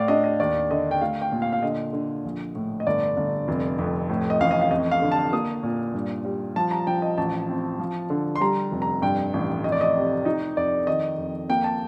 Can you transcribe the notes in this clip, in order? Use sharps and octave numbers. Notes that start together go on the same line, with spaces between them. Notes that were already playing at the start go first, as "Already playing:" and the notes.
Already playing: A2 D5 F5
D4 D#5
D#5
D#2 D5
D3 D#5
G5
A3 F5
G5
A#2
F5
F5
D3 D#5
D3
A#1
A2
D#5
G1 D5
G1
F1
F2
A2
D#5
A1 F5
D#5
F5
F2 D#5
F5
D3
A5
A#3 D#6
A#2
G2
G3
F3 A5
A#5
F3 G5
D#5
A1 A5
C4
F3
D3
C6
G3 A#5
F1
A#5
G2 G5
A1
F1 D#5
D5
D#5
C3
D#4 D#5
F2 D5
D#3 D#5
F2
A#3 G5
A5